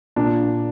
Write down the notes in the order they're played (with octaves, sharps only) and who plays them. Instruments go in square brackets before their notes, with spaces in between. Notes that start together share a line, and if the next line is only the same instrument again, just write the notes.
[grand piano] A#2 D4